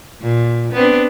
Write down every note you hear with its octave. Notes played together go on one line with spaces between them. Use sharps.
A#2
B3 C4 D4